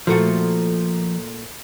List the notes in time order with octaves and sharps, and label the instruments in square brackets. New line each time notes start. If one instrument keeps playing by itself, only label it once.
[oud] A#2 A3 F#4 [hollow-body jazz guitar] F3